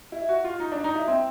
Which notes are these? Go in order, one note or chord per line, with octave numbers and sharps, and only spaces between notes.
E4
F#4
F4
D#4
D4
D#4
E4
C4